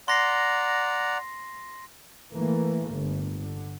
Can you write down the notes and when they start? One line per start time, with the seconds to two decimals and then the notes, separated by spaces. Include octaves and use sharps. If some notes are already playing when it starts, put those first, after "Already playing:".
0.08 D5 F#5 A#5 C6 A#6 C7
2.33 E3 A3 A#3
2.89 G1
3.36 D3